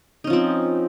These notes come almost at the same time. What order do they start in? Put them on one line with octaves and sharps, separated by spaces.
D#4 C#4 F3 C4